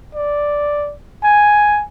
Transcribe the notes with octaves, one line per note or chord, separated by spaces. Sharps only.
D5
G#5